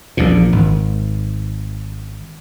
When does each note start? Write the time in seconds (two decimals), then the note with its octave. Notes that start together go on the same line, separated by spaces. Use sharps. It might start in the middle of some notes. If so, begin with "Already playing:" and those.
0.17 A#1 E2 A#2
0.52 G#1